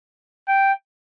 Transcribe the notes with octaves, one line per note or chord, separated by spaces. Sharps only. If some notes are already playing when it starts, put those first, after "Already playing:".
G5